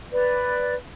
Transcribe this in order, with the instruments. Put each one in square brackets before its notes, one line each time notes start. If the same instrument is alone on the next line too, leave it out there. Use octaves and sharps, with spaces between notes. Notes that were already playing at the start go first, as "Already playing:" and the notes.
[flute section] B4 D5